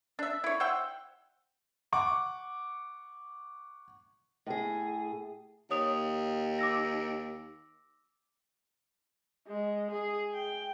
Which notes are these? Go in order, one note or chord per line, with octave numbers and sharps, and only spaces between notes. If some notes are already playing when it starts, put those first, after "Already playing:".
D4 E5
E4 C#5
C5 E5 F#5 G5
F#5 C#6 D6
A2 G#4
D#2 C#5 D#6 F7
D6 E6 A#6
G#3
G#4
G5